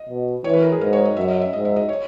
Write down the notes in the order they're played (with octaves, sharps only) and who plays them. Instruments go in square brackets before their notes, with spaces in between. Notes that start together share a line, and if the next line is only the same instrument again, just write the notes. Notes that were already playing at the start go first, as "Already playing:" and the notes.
Already playing: [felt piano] D#5
[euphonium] B2
[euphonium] E3 [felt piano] C#5
[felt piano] B4
A#4
G#4
[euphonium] G#2 [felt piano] A#4
[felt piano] C#5
D#5
[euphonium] F#2 [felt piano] E5
[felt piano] D#5
E5
[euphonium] G#2 [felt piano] D#5
[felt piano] E5
D#5
C#5